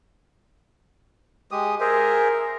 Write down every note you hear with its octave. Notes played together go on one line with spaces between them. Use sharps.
G#3 G4 D#6
G#4 A#4 C5 E5